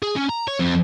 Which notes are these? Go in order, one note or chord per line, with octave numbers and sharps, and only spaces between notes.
G#4
C#4
A#5
C#5
F2